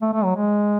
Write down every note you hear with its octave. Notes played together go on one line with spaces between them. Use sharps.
A3
A3
F#3
G#3